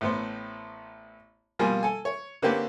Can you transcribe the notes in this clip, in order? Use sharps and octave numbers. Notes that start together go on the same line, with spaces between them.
A1 A2 B3 C5
B2 F3 G3 A#3 F4 G#5
A4 G#5
C#5
D3 A#3 C4 C#4 G4 B4